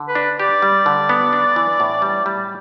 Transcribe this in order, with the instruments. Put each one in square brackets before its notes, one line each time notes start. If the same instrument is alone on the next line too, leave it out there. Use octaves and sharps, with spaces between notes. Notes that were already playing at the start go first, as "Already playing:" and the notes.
Already playing: [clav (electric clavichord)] D3
[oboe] B4
[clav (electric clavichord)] D4
[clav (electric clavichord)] G4 [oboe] D5
[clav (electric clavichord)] G3
D3
B3
D4
E3
A2
G3
G3